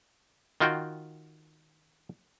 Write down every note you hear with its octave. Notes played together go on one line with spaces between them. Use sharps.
D#3 F4 F#4 G5